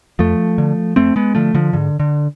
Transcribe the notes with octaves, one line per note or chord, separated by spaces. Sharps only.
F2 F3 A3
D3
F2 A3 C4
G#3 B3
D3 F3 A3
D3 F3
G#2 D3
D3